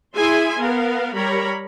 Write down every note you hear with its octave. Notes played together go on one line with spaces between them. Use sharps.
E4 G#4 E5 G#5 C6
B3 A#4 F5
G3 A#4 C#5 A#5 B5